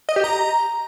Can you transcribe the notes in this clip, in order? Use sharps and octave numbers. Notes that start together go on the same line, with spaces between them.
D#5
G4
A#5